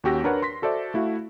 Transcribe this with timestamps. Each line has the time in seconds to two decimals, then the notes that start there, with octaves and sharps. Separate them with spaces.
0.04 D#2 C#4 F#4 G4 E6 A#6
0.24 D4 A#4 B4 C#5 F#5
0.42 C6 A#6 B6
0.62 F#4 A4 C5 D5 E5
0.94 A3 E4 F#4 F5